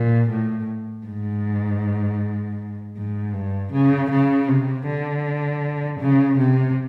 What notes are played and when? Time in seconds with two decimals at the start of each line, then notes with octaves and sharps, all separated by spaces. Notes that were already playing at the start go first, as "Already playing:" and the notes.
Already playing: A#2
0.31 A2
1.07 G#2
2.97 G#2
3.34 G2
3.73 C#3
4.11 C#3
4.49 C3
4.87 D3
6.00 C#3
6.38 C3